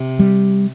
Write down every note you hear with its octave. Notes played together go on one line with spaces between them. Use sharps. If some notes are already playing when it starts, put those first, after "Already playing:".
Already playing: C3
G3